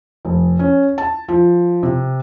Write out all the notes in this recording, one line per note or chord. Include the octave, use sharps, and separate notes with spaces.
F1
C#4
A5
F3
C3